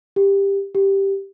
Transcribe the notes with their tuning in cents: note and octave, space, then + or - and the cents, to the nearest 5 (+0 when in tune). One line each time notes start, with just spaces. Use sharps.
G4 +15
G4 +0